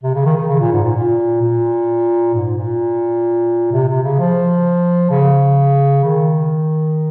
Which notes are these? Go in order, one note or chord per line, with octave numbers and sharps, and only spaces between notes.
C3
C#3
D#3
D#3
C#3
A#2
G#2
A#2
A#2
A#2
G#2
A#2
C3
C3
C#3
F3
C#3
D#3